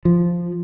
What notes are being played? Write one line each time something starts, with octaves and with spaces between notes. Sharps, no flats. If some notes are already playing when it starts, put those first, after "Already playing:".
F3